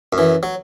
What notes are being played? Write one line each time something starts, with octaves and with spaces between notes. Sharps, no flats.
F#2
E3
F#3